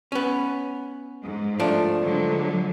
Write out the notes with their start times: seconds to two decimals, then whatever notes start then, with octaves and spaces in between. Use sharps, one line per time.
0.12 B3 C#4
1.22 G#2
1.60 F3 A3 D4
2.02 D3 F#3 G#3